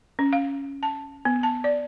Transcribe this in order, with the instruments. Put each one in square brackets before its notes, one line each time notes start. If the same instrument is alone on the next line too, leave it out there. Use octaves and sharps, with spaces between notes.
[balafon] C#4
F5
A5
B3
A5
D5